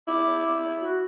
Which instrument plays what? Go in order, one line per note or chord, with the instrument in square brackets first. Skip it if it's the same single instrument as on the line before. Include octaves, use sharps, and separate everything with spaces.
[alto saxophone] E4 [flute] D6
[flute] F#4